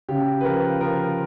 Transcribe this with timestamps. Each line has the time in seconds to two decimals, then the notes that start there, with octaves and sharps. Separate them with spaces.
0.09 C#3 G4
0.41 B4
0.44 F3 A#4
0.81 F3 A#4